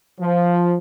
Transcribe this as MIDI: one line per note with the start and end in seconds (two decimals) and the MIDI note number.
0.19 0.76 53